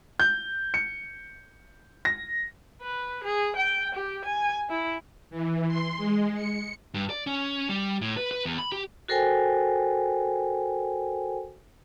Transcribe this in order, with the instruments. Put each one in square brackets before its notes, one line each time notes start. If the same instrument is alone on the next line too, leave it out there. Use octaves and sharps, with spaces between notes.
[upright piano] G6
C#7
A#6
[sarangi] B4
G#4
G5
G4
G#5
E4
[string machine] E3
C6
G#3
C#7
[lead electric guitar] G2
D5
C#4
G3
A2
B4
B4
E2
B5
G4
[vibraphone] F#4 A4 A#4 C5 G5 G#5